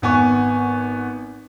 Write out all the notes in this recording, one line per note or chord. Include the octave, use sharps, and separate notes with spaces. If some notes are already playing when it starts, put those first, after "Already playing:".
G#1 B3 G#5 C#6